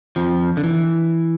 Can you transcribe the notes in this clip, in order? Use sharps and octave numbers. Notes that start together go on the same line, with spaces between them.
F2 F3
D3
E3